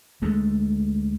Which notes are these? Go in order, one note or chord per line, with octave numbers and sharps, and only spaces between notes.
D2 G#3 A3